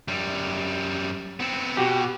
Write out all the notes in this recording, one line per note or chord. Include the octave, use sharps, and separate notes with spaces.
F#2 G3
B3 C4
B2 F#4 G4